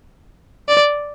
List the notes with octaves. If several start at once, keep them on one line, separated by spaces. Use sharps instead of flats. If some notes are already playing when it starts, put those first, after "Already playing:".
D5